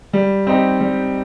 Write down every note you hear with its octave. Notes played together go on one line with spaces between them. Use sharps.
G3
C4 D#4 G4
G3